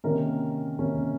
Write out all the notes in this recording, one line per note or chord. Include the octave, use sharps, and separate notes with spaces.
C3 D#3 A#3 C#4 A#4
C3 D#3 A#3 C#4